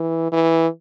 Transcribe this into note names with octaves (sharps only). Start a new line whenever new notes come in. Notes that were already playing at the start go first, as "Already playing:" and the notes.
Already playing: E3
E3